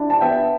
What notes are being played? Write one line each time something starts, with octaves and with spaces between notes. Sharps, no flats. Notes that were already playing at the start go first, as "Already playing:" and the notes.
Already playing: D4 E4
A5
B3 E5 G5